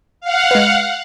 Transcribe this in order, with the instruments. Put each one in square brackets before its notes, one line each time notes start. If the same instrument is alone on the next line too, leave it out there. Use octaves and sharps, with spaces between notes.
[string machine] F5 F#5
[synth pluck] G#3 B4